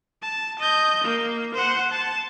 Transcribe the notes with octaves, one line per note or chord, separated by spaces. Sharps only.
A5
D#5 G6
A#3
C5 F#5
A5